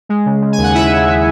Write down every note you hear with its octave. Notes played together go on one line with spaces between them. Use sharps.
G#3
C#3
C#3
G#5
D#2
F#5
D#2 E4 E5
C#3
G#3